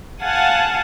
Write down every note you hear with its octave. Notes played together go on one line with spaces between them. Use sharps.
F5 F#5 G#5 A5